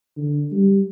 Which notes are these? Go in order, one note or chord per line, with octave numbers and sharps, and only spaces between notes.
D3
G3